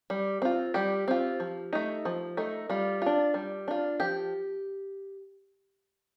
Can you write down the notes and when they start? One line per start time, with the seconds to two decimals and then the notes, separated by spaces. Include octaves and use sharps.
0.10 G3
0.42 C4 F4
0.74 G3 G4
1.08 C4 F4
1.40 F3
1.73 A3 D#4
2.05 F3
2.37 A3 D#4
2.70 G3 F4
3.02 D4 F4
3.34 G3
3.68 D4 F4
4.00 F3 G4